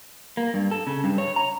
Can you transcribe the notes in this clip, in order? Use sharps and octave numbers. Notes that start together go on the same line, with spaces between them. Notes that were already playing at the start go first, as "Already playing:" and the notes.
A#3
G2
A4
C#3
G2
C#5
A#5